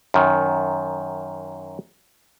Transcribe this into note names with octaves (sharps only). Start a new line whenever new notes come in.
F#2 D#3